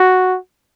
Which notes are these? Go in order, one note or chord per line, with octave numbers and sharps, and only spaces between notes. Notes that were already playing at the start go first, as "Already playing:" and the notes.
Already playing: F#4